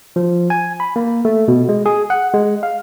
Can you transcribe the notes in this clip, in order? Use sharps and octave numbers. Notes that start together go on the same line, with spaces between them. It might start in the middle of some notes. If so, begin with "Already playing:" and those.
F3
G#5
B5
A#3
A3
B2
G#3
G#4
F#5
G#3
F5